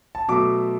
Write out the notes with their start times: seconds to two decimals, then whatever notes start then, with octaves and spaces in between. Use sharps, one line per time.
0.15 A5
0.28 B2 F#3 A3 D6